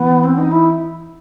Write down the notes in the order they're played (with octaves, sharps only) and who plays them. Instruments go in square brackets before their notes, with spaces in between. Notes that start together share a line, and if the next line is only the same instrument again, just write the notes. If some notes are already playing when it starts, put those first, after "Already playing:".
Already playing: [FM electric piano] E3 [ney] B3
[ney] C4
D#4
E4